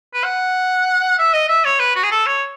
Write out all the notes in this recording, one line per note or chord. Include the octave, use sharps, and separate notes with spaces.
B4
F#5
E5
D#5
E5
C#5
B4
F#4
G#4
A4
C#5